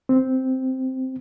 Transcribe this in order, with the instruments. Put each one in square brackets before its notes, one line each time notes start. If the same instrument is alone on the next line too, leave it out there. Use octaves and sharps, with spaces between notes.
[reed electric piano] C4